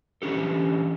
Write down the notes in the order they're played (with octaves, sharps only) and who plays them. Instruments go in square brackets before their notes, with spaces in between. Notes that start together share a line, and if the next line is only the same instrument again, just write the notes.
[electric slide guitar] E3 C#4 D4 G4 A4